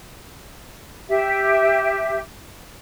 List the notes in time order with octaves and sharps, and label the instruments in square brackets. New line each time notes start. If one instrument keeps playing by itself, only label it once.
[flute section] G4 E5